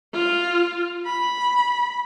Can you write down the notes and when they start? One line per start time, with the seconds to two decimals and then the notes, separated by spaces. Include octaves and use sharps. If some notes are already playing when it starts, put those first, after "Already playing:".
0.14 F4
1.06 B5